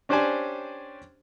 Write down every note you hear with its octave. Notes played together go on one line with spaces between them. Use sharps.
C#4 D4 G4 C5 D5 G#5